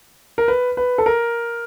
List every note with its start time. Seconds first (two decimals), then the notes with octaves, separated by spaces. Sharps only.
0.38 A#4
0.48 B4
0.77 B4
0.98 A4
1.06 A#4